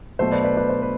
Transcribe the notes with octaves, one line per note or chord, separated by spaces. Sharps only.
B2 F#3 A3 C5
B4 D5
B4 D5
B4 D5
C5
B4